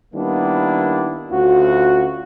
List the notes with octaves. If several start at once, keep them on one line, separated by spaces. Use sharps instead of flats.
D#3 G3 A#3 B3 D4 E4
D2 C#4 F4 F#4